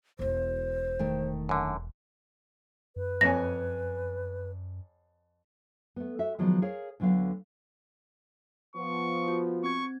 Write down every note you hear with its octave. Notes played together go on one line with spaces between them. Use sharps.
E1 E4 C5
D#3 A3 G5
F#2 D3
F#2 B4
F2 C#5 G#5 A#6
A3 B3
F#4 E5
D#3 F3 F#3 G#3 B3
G#4 A#4 C#5 F5
D2 D3 F#3 B3 F5
F3 B3 C#6
F4 F#4
C4 C#6 G#6